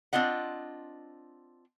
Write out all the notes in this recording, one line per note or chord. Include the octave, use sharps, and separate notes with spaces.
C4 D4 F4 D#5 F#5